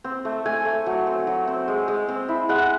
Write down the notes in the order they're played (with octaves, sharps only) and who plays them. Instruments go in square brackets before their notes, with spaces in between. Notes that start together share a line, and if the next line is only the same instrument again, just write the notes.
[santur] C4
A3
A3 G#5
A3
F#3
C4
F#3
C4
G#3
G#3
C4
E4
G#3 F#5